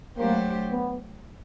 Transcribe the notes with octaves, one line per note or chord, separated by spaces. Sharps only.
F#3 A3 A#3 D4 G4 C5
B3